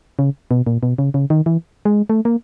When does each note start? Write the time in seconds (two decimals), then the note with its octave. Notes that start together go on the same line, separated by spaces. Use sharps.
0.19 C#3
0.51 B2
0.67 A#2
0.83 B2
0.98 C#3
1.14 C#3
1.30 D#3
1.46 E3
1.85 G#3
2.10 A3
2.25 A#3